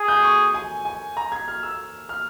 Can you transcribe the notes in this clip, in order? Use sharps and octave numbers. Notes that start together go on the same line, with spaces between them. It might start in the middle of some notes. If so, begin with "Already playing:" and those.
Already playing: G#4
G6
C#6
G#5
G#5
A#5
G#6
F6
E6
F6